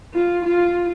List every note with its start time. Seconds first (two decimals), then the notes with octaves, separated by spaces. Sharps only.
0.14 F4
0.45 F4